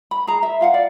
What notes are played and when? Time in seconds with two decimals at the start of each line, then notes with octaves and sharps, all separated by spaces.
0.11 B5
0.27 G#4 A#5
0.43 E5
0.61 F4 F5 F#5
0.74 D5